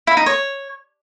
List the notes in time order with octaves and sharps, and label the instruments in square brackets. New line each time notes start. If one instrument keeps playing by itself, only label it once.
[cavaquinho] E4
D#4
C#5